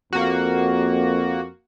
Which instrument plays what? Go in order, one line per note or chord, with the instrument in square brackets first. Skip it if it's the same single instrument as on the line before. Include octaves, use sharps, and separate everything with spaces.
[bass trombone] F2 [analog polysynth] A#3 F#4